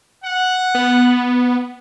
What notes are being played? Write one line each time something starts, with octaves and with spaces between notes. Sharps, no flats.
F#5
B3